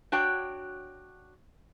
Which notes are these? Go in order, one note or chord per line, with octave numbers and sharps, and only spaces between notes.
D4 F#4 C#5 G5